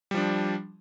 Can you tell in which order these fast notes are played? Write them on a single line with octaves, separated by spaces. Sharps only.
G3 F3 D4